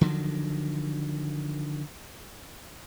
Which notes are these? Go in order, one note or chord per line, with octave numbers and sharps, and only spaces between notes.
D3 D#3 F3 F#3